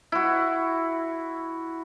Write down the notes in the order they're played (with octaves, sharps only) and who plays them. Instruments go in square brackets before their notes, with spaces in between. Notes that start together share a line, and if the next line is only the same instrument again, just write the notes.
[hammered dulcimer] E4 F#4